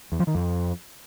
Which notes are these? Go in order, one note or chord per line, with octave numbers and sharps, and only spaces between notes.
E2
F3
D#3
F2